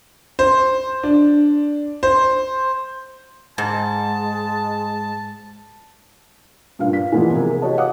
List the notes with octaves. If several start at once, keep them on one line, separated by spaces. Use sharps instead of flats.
C5
D4
C5
G#2 G#3 A5
G2 A#2 F5
B6
A#2 E3 F3 G#3 A#3 B3
C3 G#4 A#4
F#4 G4 C#5 D#5 A5
F5 F#5 D6 D#6